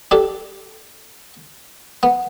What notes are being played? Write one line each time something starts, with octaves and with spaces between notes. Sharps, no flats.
D4 G4 A4
B3